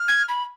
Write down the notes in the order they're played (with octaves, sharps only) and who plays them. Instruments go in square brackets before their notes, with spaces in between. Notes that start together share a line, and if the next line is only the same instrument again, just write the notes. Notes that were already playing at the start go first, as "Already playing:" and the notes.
Already playing: [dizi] F6
[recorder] G#6
B5